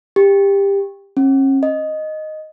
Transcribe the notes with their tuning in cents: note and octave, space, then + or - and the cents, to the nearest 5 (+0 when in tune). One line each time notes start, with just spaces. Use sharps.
G4 +20
C#4 -40
D#5 -5